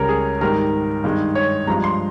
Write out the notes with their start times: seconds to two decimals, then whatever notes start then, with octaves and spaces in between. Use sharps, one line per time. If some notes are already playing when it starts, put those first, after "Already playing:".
Already playing: C#2 C#3 G3 A#4 C#5
0.09 G#4
0.40 G#2 D#3 G3 A#4
1.04 G2 D#3 G#3
1.35 C#5
1.67 G2 F3 G#3 A#5
1.84 C6